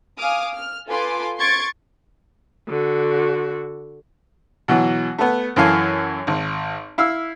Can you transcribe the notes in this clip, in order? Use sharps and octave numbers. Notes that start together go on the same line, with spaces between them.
F5 G#5 D6 D#6 F6
F6
F4 A4 B4 G#5 C6 D6
C6 C#6 G#6 A6 C#7 D7
D3 F#4
B2 E3 F#3
A3 B3
F#2 E3 A4 F5 G#5
G#1
E4 F5 E6